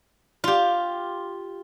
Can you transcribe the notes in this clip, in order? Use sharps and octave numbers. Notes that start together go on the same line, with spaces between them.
F4 G4